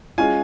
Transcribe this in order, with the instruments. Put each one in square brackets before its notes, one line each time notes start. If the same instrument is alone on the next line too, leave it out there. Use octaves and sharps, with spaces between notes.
[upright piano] G#3 C#4 F4 [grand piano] G#5